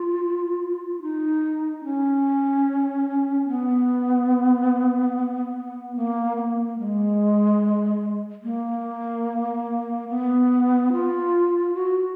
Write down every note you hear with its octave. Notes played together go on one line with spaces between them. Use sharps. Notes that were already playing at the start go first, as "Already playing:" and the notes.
Already playing: F4
D#4
C#4
B3
A#3
B3
A#3
G#3
A#3
B3
F4
F#4